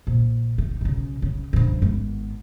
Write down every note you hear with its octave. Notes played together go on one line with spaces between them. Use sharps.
A#1
D#4
B1 C#3
C#3
G2 F3
G#1 B3